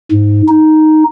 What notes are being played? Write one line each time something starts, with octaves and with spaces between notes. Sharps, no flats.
G#2
D#4